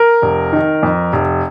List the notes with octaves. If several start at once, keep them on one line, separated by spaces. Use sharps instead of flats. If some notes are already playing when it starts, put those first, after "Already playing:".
Already playing: A#4
F1
D#3
F2
F1